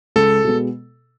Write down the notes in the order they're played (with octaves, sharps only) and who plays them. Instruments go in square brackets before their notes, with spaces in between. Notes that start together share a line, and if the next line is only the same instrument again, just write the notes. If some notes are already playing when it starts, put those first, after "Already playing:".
[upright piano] C#2 [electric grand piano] A4
[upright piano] B2 G#3 B3